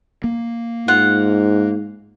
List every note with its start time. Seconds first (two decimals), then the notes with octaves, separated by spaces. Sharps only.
0.24 A#3
0.88 G#2 F4 F#5